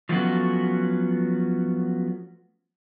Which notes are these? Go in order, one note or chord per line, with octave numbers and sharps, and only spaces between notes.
F3 F#3 A3 B3 C#4 F#4